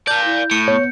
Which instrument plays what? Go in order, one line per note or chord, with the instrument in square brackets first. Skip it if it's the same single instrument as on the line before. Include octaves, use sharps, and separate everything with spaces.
[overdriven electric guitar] D5 F5 [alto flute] A5 [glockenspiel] G6
[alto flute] E4
[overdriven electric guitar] A2 [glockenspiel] C#7
[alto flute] B3 [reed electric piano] C#5